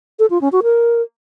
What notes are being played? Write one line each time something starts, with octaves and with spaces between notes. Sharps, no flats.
A4
F4
C#4
F#4
A#4